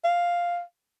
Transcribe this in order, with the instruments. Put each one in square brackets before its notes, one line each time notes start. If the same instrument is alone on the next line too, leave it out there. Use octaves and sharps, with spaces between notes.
[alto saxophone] F5